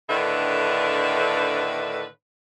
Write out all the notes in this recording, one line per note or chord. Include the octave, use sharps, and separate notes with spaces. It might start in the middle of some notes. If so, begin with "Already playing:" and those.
A2 D3 D#3 D4 B4 E5